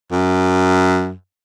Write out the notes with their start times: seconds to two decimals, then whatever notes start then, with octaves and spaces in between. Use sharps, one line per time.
0.12 F#2